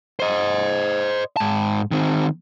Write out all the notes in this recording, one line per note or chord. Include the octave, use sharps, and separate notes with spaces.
C5 D#5
G#2 A5
D#3 C4